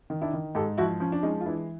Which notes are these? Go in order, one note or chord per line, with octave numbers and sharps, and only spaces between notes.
D#3
D4 E4
D#3
G#2 G4 A4
F3 E4 F#4
F3 C#4
D4
G#3 C#4 D#4
F4
E3 D4 E4